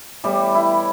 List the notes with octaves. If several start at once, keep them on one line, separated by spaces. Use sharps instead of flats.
A2 E3 G3 B3 G4
E4